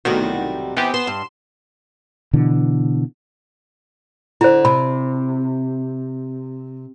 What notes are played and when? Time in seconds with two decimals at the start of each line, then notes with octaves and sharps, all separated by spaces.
0.05 B1 A2 C3 D#3 G3 F#4
0.77 E3 B3 C4 G4
0.94 B3 C6 E7
1.07 G2
2.33 B2 D3 E3
4.41 D3 E4 C5
4.65 C3 B5